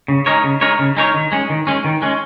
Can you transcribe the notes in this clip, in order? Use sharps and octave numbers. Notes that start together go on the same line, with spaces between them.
C#3
G#3 D#4 A#4 C#5
C#3
G#3 D#4 A#4 C#5
C#3
G#3 D#4 A#4 C#5
D#3
G#3 C#4
D#3
G#3 C#4
D#3
G#3 C#4